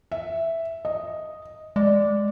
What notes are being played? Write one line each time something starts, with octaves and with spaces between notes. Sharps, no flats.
E5
D#5
G#3 D5